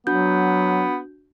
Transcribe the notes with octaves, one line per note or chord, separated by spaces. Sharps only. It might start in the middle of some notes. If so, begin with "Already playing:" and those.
F#3 B3 D4 F#4 G6